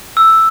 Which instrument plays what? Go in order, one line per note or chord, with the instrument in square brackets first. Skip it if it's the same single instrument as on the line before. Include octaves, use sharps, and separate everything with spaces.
[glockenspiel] E6